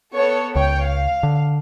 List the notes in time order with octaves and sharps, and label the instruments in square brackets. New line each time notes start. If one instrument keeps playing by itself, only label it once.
[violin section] B3 A4 C#5
[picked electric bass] C#2 [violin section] C#5 G5
[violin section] F5
[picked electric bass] D3